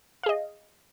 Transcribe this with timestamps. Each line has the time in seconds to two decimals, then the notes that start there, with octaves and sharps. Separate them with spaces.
0.23 F5
0.26 G#4
0.29 D#5